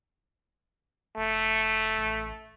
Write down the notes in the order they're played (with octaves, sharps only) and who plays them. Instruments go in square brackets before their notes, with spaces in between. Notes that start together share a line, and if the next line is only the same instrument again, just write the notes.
[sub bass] F1 [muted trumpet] A3
[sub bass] A1